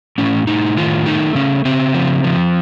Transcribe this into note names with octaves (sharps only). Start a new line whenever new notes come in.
A2 C#4
A2 D#4
D#3 F4
A3 D#4
C#3 C#4
C#3 C4
F3
F3